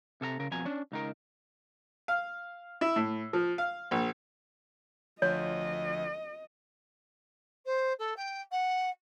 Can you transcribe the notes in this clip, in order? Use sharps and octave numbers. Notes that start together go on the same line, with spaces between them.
C3 A4 E5 A#5
C#3 A#4
F2 B2 G#5 A#5
C#4 D4
C#2 D#4 A#4
F5
E4
A2
F3
F5
A#1
D2 F3 C#5 D#5
C5
A4
G5
F#5